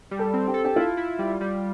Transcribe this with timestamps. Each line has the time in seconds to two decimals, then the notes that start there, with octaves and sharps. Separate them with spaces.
0.11 G3
0.19 A4
0.34 C4
0.48 G4
0.54 A4
0.64 G4
0.76 E4 F4
0.97 E4
1.19 G3
1.41 G3